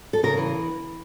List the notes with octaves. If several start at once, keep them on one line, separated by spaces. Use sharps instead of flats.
A4
C#3 A#4
E3